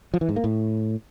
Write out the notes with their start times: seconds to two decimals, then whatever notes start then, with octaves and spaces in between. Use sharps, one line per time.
0.14 F3
0.21 E3
0.29 G#2
0.36 A#3
0.44 A2